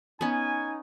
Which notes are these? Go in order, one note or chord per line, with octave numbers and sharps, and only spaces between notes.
B3 C#4 D#4 G#5